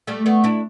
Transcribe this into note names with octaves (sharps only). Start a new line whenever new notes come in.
G3 A3
A3 B3
D4 E4